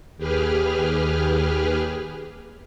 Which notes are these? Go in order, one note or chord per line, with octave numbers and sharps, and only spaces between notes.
D#2 G4 G#4 B4 F6